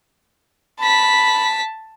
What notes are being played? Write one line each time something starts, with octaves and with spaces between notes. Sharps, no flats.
A5 B5 B6